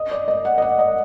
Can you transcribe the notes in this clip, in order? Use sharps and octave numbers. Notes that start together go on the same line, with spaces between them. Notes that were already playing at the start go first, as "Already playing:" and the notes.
Already playing: D#5
D5
D#5
F#5
D#5
F#5
D#5